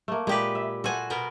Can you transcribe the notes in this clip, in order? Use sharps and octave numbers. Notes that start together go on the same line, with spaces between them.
A3 A#3
A#2 G#3 G4 B4
E5
F#4 A4 C5 F#5 G#5
B2 B3 A#4